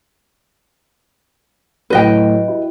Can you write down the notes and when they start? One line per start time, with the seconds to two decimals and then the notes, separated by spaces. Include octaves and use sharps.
1.90 A2 F#3 F#4 B4 D#5 G5
2.48 E4 F#4